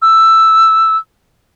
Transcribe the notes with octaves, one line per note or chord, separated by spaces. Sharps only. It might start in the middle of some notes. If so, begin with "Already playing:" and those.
E6